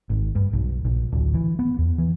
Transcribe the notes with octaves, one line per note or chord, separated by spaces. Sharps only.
G#1
G2
B1
A#1
D1
E3
B3
E2
E3